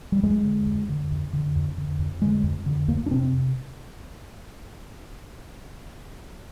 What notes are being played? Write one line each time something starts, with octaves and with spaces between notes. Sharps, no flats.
G3
F2 G#3
D3
F2
D3
F2
D3
F2
D3
F2
D3 G#3
F2
D3
F2 A#3
D4
C3 C4